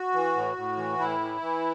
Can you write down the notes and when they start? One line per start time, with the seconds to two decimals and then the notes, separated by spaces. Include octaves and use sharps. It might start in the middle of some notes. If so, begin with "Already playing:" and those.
Already playing: F#4
0.14 E3
0.35 A2
0.57 A2
0.77 E3
0.98 A2 E4
1.20 E3
1.41 E3